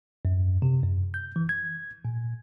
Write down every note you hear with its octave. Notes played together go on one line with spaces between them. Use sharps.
F#2
C3
F#2
G6
E3
G#6
A#2